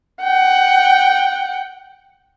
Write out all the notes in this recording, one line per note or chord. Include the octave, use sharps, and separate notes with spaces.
F#5 G5